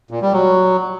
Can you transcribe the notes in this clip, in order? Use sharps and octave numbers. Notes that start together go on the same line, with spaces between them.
A#2
G3
F#3